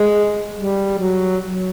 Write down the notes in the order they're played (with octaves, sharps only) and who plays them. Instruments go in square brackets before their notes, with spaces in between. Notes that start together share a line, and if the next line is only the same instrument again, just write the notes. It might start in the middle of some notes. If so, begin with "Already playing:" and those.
Already playing: [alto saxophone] G#3
G3
F#3
F#3